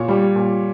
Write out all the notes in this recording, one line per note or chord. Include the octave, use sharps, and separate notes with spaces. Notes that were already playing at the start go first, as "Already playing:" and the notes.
Already playing: A#2 C#5
G3
A#2